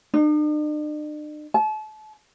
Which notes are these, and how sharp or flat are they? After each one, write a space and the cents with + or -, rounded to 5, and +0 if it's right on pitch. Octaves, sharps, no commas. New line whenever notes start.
D4 +45
A5 -35